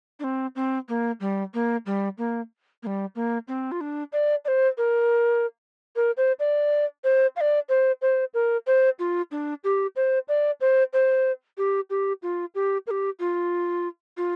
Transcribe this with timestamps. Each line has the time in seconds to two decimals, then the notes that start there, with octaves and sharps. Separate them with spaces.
0.20 D4
0.24 C4
0.56 C4
0.89 A#3
1.20 G3
1.54 A#3
1.86 G3
2.18 A#3
2.83 A#3
2.87 G3
3.16 A#3
3.48 C4
3.72 F4
3.81 D4
4.13 D5
4.45 D5
4.48 C5
4.78 A#4
5.96 A#4
6.17 C5
6.40 D5
7.04 C5
7.36 F5
7.41 D5
7.69 C5
8.02 C5
8.34 A#4
8.67 C5
8.99 F4
9.32 D4
9.64 G4
9.96 C5
10.28 D5
10.61 C5
10.93 C5
11.58 G4
11.90 G4
12.23 F4
12.55 G4
12.87 A#4
12.91 G4
13.20 F4
14.17 F4